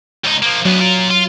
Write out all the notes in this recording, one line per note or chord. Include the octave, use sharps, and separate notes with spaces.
C#2 D#4
F3 A#3
D2 F#3 B3
F4 A#4
F4